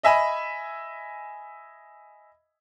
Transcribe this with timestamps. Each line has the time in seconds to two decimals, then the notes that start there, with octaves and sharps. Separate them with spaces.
0.03 D#5 E5 G#5 B5